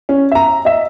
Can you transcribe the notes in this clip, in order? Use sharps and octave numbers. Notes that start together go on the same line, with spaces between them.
C#4
E5 A#5
D#5 E5